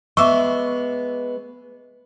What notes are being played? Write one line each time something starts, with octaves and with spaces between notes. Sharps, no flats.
G#3 B3 E5 C#6 D6 E6